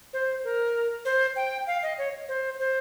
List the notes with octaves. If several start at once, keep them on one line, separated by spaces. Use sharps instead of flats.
C5
A#4
C5
G5
F5
D#5
C#5
C5
C5